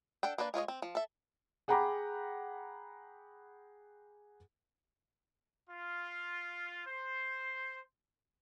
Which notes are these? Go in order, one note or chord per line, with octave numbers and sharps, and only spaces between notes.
D4 A4 F#5 G5
A#3 D4 B4 D5
G#3 F4 C#5 D#5
C4
F3
A4 E5
G#4 F#5 G5 A#5 B5 D6
F4
C5